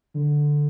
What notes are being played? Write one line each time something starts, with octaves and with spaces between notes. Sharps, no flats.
D3